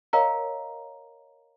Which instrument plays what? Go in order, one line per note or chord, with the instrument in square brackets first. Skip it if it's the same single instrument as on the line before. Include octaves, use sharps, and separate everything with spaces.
[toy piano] A#4 C#5 D#5 F5 G5 A#5